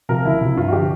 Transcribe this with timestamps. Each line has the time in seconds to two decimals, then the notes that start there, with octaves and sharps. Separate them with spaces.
0.09 C3 F3 A#4
0.25 C#2 E4
0.41 C3 F3
0.56 G2 F4
0.68 F#4
0.73 D3 F3 G4